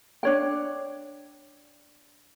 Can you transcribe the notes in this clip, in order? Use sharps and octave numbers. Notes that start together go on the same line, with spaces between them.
D4 C#5 G5